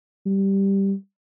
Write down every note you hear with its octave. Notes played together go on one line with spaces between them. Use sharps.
G3